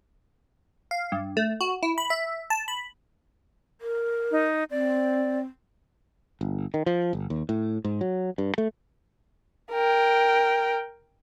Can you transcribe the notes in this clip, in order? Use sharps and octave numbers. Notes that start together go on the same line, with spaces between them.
F5
G2
A3
F#4
E4
B5
E5
A5
B5
A#4
D#4
C4 D5
G1
D#3
F3
G1
D#2
A2
G#2
F#3
G2
A3
A#4 G5